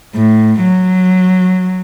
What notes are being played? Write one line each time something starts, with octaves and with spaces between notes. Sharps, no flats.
A2
F#3